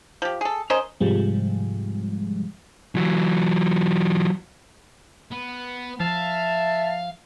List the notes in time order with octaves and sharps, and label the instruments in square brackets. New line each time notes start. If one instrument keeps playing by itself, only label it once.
[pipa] F3 G4
G#4 A4
C#4 A#4 C5 D#5
[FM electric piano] G#2 C3 F3 G3 G#3
[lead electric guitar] E3 F#3
[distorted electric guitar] B3
[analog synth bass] F3 [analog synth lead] E5 [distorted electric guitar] F5 [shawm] A5